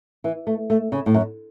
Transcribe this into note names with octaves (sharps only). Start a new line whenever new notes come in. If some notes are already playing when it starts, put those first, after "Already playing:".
E3
A3
A3
C#3
A2
F#2